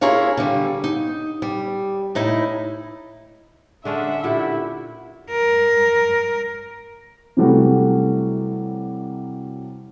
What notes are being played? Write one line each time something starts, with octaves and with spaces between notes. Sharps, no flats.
E4 F4 G#4 A#4 C#5 F5
D3 G3
D#4
G3
A2 D#4 E4
D3 G#3 C#4 D4 E5 F#5
A#2 E4 G4 A4
A#4
C3 E3 F#3 G3 A3 F#4